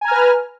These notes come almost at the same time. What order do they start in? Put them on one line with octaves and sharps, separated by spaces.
G#5 A#5 F6 B4